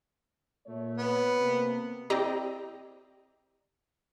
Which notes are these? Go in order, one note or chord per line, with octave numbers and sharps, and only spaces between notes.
A#2 A3 C#5
B3
C3 A#3
C4 E4 G4 D5 D#5 A#5